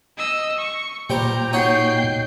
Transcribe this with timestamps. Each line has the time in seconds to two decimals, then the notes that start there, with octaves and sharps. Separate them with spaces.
0.17 D#5 E6
0.58 C#6
1.10 A#2 G3 C5 G5 A#5
1.53 D#4 F#4 C#5 G6 C7